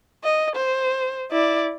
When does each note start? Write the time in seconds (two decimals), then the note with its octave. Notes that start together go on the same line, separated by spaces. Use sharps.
0.24 D#5
0.55 C5
1.32 E4 D5